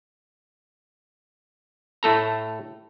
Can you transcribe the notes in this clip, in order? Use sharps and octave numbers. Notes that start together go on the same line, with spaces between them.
A2 A3 A4 A#5